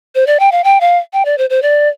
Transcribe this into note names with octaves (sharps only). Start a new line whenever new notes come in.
C5
D5
G5
F5
G5
F5
G5
D5
C5
C5
D5